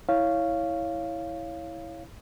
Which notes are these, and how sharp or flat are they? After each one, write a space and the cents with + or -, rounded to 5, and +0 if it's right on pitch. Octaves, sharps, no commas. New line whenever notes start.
E4 -10 C#5 +0 F5 -10